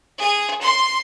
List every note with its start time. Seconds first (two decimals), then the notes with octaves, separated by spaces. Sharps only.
0.18 G#4
0.61 C6